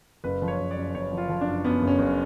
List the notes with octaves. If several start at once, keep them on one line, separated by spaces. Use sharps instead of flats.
F#1 B4
F3
C#5
F#1
D5
F#2
F#1 C#5
F3
F4
F3
D4
F#2
F#2 B3
F#1
C#4
F#1